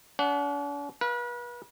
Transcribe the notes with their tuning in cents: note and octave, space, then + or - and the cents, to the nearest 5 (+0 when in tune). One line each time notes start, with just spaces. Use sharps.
D4 -45 F#5 +0
B4 -35 F5 +0